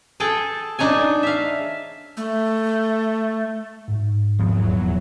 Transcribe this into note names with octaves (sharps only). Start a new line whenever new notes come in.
G#4 A4 G5 A5
D4 D#4 C#5 G#5
E5 F5
A3
G#2
D#1 E2 F3 F#3 B3